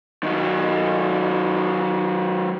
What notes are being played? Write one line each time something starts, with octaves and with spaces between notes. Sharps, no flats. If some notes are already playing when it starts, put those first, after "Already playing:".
D#3 F#3